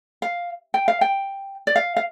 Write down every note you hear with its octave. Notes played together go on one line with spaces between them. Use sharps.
F5
G5
F5
G5
D5
F5
F5